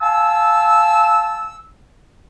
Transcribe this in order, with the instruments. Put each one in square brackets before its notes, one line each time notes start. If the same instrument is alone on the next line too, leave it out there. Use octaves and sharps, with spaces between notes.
[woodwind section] F5 G#5 A5 E6